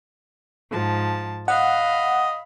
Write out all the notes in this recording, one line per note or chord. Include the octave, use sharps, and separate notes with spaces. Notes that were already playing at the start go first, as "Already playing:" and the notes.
G#2 F3 A5
D#5 F5 F#5 B5